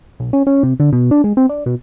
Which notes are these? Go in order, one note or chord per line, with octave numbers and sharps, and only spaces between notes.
B1
C#4
C#4
C3
D3
B2
D4
G#3
C4
D4
B2